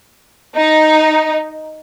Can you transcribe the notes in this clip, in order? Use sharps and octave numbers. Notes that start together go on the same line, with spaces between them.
D#4